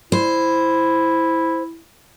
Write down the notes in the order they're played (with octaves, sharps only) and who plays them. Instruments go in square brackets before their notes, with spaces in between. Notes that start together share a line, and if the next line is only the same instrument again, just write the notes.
[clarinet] E4 [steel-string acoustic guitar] C5